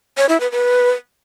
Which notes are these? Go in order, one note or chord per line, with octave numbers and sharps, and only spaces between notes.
C#5
E4
B4
B4